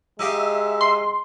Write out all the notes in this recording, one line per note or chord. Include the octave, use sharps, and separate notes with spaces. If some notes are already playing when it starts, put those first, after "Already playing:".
G#3 D#4 G4 E5 F5
C6